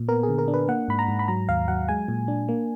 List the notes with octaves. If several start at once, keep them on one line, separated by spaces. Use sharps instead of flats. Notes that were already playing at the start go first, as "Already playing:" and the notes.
Already playing: A#2
B3 A#4
G#4
D3
A#4
D4
B4
A#3 F#5
G#2 B5
A#5
G#2
B5
F#3 A#5
D#2 F5
F#3 F#5
G#3 G#5
A#2
D4
A#3